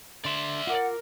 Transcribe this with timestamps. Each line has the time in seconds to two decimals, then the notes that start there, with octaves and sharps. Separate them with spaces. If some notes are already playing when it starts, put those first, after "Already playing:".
0.25 D3 D5 E5 C6
0.67 F4 A#4 F#5 D6